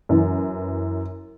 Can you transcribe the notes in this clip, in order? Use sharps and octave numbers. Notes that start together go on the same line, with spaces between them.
F#2 E3